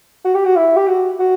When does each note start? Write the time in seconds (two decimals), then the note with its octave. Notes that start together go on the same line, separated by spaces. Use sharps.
0.25 F#4
0.35 G4
0.45 F#4
0.56 E4
0.76 G4
0.87 F#4
1.19 F#4